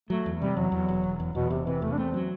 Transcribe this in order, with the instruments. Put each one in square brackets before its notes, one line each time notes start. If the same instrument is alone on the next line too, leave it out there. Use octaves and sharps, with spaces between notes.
[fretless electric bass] F#3 [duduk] A3
[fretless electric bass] E2
[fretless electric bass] C3 [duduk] G3
[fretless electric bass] E2 [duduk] F#3
[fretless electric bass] E2
E1
E1
E2
[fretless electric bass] E2 [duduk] B2
[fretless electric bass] E1 [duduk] C3
[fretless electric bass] C3 [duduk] E3
[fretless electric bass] E2 [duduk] A3
[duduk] D4
[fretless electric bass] A3 [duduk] C4
[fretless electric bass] F#3